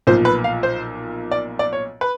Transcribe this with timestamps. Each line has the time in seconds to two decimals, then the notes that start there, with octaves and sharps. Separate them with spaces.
0.07 B1 A#2 F3 C5
0.25 B4
0.44 F5
0.63 C5
1.31 D5
1.59 D5
1.73 C#5
2.01 B4